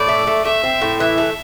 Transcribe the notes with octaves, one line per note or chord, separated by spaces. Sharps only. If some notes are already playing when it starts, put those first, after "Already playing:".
Already playing: A2 D5
A3
A3
A3 E5
C4
A2
E3 E5
A3